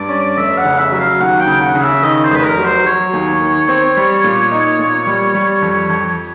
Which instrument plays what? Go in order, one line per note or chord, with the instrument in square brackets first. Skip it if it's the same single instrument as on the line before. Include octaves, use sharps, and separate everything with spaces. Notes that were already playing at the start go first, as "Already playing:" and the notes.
Already playing: [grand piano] G2 [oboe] D5
[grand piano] C#4
[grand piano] F1 [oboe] E5
[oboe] F#5
[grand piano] C#3
[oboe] E5
[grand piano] F#3 [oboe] E5
[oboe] F5
[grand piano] D#2 [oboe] F#5
[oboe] G5
[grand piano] C#3
[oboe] F#5
[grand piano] C#3
[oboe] E5
[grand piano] D#3 [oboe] D#5
[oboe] C5
[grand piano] F1 [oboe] B4
[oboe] A#4
[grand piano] F#3
[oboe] C5
[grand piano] F#3 [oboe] C#5
[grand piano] D#2
D#3
C4
G3
A#2
D#4
A#2
G3
G3
F2
F2